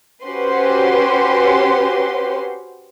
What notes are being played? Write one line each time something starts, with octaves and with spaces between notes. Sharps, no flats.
C#4 F#4 G4 B4 C5 C6